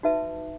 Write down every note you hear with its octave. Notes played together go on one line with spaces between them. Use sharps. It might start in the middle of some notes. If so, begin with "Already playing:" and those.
D#4 F#4 B4 E5 A5